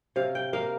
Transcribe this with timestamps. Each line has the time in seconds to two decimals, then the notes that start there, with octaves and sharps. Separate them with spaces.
0.16 C3 F5
0.35 G5
0.53 A#3 F5